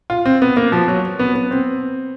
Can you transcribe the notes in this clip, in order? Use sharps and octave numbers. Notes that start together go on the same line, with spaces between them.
F4
C4
B3
A#3
F3
F#3
B3
B3
C4